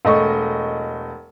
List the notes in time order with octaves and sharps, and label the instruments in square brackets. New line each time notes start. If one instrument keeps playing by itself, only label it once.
[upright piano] E1 A3 D#5 C#6